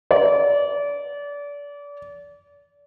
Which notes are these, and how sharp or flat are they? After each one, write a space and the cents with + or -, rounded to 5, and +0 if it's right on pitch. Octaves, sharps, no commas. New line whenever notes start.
D5 -30